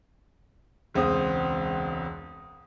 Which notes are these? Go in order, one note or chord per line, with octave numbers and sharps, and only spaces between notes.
E1 C#2 C4 D#6